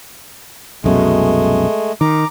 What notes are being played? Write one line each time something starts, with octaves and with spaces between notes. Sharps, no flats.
C2 F#2 B2 G#3 A3
D#3 A#5 D6